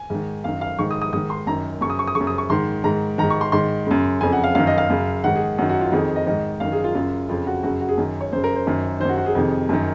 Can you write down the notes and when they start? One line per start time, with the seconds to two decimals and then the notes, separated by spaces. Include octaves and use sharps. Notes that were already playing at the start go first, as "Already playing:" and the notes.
Already playing: G#5
0.10 G#2 D#3
0.44 F#2 D#3 F5
0.61 F5
0.79 G#2 D#3 C#6
0.91 D#6
1.02 D#6
1.13 G#2 D#3 D#6
1.30 C6
1.47 F#2 D#3 A#5
1.81 F#2 C#6
1.86 C#3 D#6
1.99 C#6
2.07 D#6
2.15 C#3 C#6
2.20 F#2
2.27 D#6
2.38 C#6
2.50 G#2 D#3 C6
2.84 G#2 D#3 A#5
3.18 G#2 D#3 A#5
3.30 C#6
3.41 C6
3.52 G#2 D#3 C6
3.87 F#2 C#3
4.21 F2 C#3 G#5
4.33 F#5
4.44 F5
4.55 F#2 D#3 F5
4.67 D#5
4.78 F5
4.90 F#2 C#3
5.24 G#2 D#3 F#5
5.36 G#4
5.58 F#2 F#4
5.62 D#3
5.70 F#4
5.81 F4
5.92 F2 D#3 G#4
6.16 D#5
6.26 G#2 D#3 D#5
6.60 F#2 D#3 F5
6.72 G#4
6.84 F4
6.95 F#2 C#3 F4
7.29 F2 C#3 F4
7.47 F#4
7.63 F#2 C#3 F#4
7.81 F#4
7.89 G#4
7.97 F#2 D#3
8.21 C#5
8.32 F#2 C#3 C5
8.44 A#4
8.56 C5
8.67 F#2 D#3
9.00 D#3 C5
9.05 F#2 F#4
9.17 F#4
9.26 G#4
9.35 F2 C3 D#3
9.69 F#2 D#3